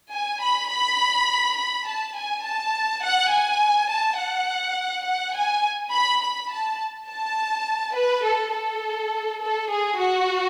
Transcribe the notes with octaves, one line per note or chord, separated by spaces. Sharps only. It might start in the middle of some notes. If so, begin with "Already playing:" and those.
G#5
B5
B5
B5
A5
G#5
A5
F#5
G#5
A5
F#5
F#5
G#5
B5
B5
A5
A5
B4
A4
A4
A4
G#4
F#4